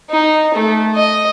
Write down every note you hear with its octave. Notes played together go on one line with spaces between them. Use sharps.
D#4
A3
D#5